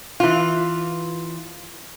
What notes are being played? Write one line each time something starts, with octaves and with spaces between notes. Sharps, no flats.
E3 F4